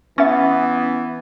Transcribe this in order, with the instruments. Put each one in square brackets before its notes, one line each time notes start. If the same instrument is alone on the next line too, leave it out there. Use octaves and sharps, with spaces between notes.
[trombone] E3 [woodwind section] B3 [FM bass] C#4 [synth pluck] E5 C#6 A6